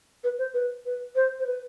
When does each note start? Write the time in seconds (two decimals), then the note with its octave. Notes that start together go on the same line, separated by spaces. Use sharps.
0.23 B4
0.38 C5
0.54 B4
0.85 B4
1.15 C5
1.39 C5
1.46 B4